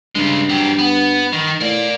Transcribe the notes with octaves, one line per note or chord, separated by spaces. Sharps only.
G2 C#3 G#3
F#3 G4
B3
D#3
A2 A#4 D5